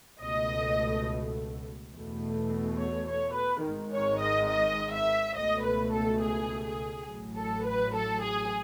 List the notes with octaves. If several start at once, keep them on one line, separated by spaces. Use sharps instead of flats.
C#2 B2 A3 D#5
E2 B2 A3
C#5
C#5
B4
G#1 G#2 D#3 G#3
C#5
D#5
D#5
E5
C#2 B2 A3 D#5
B4
A4
G#4
G#4
A1 A2 F#3
A4
B4
A4
G#4